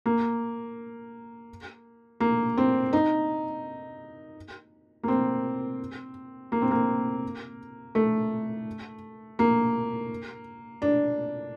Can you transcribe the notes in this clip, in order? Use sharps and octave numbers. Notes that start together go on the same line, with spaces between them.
A#3
A#3
C4
D#4
A#3
C4
A#3
C4
A#3
A3
A#3
D4